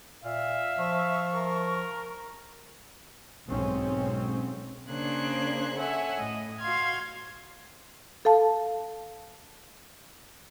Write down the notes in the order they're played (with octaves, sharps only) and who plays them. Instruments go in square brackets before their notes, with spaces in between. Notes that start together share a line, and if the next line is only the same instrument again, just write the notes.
[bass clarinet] A#2 [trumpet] E5 [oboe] F5
[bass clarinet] F3 [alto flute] C#6
[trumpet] A#4
[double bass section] B1 G#2 C4 C#4
[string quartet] C#3 A#3 D4 C5 F#6 G#6
A4 C#5 E5 F#5 G#5
A2 D#5
F#4 F5 C6 F6 G#6
[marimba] A4 F5 A5